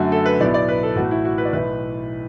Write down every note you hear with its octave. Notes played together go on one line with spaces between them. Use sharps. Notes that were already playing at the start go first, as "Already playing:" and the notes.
Already playing: F#2 D3 A3 F#4
A4
B4
B1 A2 F#3 B3 D5
D5
B4
A4
A1 A2 A3 F#4
E4
F#4
B4
D5
B1 A2 E3 B4